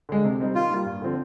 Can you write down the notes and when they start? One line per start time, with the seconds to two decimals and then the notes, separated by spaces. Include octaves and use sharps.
0.09 D3 G#3
0.24 C3
0.40 G3 C4 D#4
0.55 D#3 F4
0.71 G3 A#3
0.86 G2
1.02 D3 F3 C4 F4